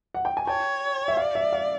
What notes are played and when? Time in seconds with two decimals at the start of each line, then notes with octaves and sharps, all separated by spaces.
0.15 F#5
0.25 G5
0.37 G#5
0.47 C#5 G5 A5
1.08 E5
1.17 D5 F5
1.35 E5
1.53 F5